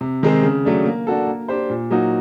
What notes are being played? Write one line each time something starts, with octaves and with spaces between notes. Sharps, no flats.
C3
D#3 G#3 C4
C#3
F#3 A3 D4
A#3
D4 F#4 A4
A#3
D4 G4 C5
A#2
F#3 A#3 D#4 F#4